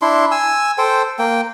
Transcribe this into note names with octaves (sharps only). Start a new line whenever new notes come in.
D4 E4 C6
G#5 E6
A4 C5 G5
A#3 G5